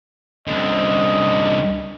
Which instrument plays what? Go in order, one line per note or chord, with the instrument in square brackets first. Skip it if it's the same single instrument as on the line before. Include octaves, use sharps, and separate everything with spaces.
[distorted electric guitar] C2 D3 [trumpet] D#5